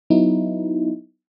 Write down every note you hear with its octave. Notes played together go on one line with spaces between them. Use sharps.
F#3 B3 D#4 E4